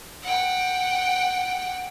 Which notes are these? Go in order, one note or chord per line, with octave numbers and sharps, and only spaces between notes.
F#5 G5